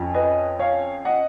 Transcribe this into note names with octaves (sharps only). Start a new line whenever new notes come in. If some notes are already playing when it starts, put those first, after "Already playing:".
Already playing: F2 F3 C#4
B4 D#5
C#5 F5
D#5 F#5